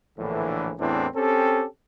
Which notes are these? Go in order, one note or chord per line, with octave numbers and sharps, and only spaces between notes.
A#1 A2 D3 E3
E2 A2 E3 C4 D4
C4 C#4 G4 A4